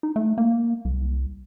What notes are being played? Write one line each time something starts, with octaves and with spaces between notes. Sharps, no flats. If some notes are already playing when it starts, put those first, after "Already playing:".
D#4
A3
A#3
C2